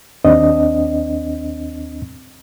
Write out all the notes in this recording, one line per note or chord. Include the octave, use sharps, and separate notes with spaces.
D#2 C4 D4 D#5